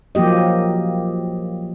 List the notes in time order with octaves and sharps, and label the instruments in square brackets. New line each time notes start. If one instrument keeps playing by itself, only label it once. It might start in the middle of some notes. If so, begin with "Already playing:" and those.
[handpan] F3 F#3 A#3 G4 D#5